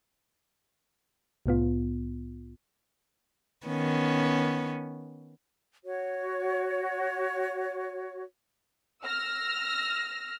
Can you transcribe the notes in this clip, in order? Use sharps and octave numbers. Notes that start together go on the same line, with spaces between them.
C2 A2 B3 F4
D#3 B3 C#4
F#4 C#5
E6 F6 A#6